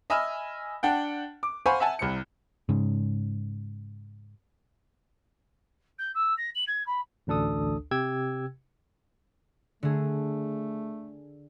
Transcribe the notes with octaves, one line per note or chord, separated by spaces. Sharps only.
D#5 E5 G#5 B5 E6 F6
D4 F#5 G5
D6
C5 F5 F#5 G#5 B5 C#6
E5 F#5 G#5 A5
C2 C3 C#7
G#2 C#3
G6
E6
A#6
F#7
G#6
B5
A1 D2 D4 A4 D#6
C3 G4 G5 E6 G#6
D3 A3 G#4